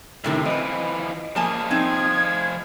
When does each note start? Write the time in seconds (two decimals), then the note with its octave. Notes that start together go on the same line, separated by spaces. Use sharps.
0.24 F#2 A2 C3 D#3
0.45 E3 F3 C4 B4 D#5
1.36 F3 A#3 G#4 G#5 A5
1.71 C4 D#4 G#6